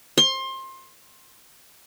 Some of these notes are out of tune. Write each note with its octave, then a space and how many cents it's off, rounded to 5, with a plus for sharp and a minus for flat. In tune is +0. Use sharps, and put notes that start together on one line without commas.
C6 +25